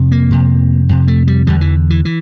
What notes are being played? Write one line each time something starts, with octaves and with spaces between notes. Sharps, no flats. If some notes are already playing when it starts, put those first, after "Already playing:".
Already playing: F2 C3
A#3
F2 C3
F2 C3
A3
G3
E2 D3 G3
E3
E3
E3